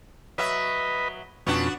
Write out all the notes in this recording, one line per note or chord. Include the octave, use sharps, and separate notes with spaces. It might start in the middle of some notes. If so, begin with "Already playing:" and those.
F#3 B4 D#5 E5
F2 B2 B3 C#4 D4 F#4